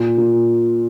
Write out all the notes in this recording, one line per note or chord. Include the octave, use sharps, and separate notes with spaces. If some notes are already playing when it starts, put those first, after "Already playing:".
Already playing: A#2
A#2